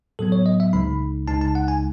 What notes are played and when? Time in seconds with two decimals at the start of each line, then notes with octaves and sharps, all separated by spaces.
0.19 A2 F#3 B3 A4
0.32 C#5
0.46 D#5
0.60 E5
0.73 C#2 C#3 G#3 D#4 B5
1.28 C#2 C#3 G#3 D#4 A5
1.41 A5
1.55 F#5
1.68 G#5